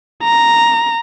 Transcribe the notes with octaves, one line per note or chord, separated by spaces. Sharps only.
A#5